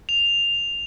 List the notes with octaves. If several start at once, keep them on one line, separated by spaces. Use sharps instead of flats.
F7